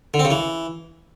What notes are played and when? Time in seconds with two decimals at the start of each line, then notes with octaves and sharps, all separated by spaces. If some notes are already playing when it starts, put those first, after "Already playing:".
0.14 D3
0.19 C4
0.25 C#3
0.31 E3